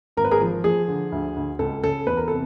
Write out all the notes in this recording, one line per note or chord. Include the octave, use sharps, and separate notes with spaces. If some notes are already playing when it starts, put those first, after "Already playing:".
G#1 A#4
B4
G#4 A#4
F3
F3 G#4
D3
D2
D2
C#2 A4
C#3 A4
E2 B4
A#4
C3 A4